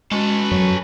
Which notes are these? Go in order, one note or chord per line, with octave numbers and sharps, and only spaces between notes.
G#3 C#4 F#4 A4 B4
F#2 F#3